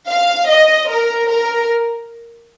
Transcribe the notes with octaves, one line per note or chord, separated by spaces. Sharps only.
F5
D#5
A#4
A#4